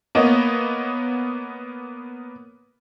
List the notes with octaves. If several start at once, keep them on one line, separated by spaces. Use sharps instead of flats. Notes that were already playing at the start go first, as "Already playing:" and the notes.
A#3 B3 C#5 D#5